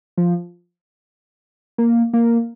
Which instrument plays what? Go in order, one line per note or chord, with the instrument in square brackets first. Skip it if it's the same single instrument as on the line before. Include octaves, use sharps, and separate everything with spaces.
[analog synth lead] F3
A#3
A#3